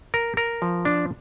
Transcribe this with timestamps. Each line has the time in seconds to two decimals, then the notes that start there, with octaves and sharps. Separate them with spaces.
0.14 A#4
0.37 A#4
0.62 F3
0.85 D4